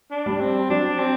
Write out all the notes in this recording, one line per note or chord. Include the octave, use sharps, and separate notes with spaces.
D4
G3
C4
F#3 D4
C4